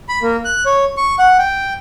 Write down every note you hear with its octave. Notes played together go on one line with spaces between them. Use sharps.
B5
A#3
F#6
C#5
C#6
F#5
G5